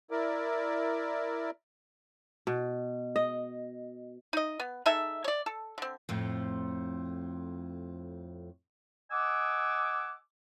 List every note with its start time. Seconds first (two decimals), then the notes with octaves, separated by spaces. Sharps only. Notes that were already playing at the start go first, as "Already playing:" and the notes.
0.11 E4 A#4 D5
2.47 B2
3.16 D#5
4.33 D#4 D#5
4.60 B3
4.86 G#3 D#4 A4 E5
5.24 C#5 D5
5.46 A4
5.78 D3 C4
6.09 F2 A2 F3
9.11 D#5 F#5 G#5 D6 E6